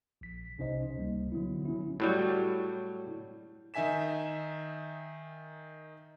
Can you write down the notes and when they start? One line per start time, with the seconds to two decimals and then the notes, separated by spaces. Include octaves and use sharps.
0.21 A#1 B6
0.58 C2 C3 C#4 D#4 C5 D#5
0.97 C#2 G3 A#3
1.32 D3 F#3 B3 E4
1.65 F#3 C#4 E4
2.00 A2 F#3 G3
3.74 D#3 D#4 E5 G#5 B6 E7